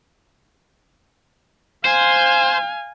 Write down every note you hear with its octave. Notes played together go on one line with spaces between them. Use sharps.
C5 F5 G#5